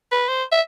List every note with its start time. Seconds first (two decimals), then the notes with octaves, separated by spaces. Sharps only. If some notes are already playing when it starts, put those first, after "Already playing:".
0.11 B4
0.28 C5
0.52 E5